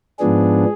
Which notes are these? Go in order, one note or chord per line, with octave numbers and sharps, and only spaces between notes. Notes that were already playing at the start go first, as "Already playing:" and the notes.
G#2 F3 B3 D4 G#4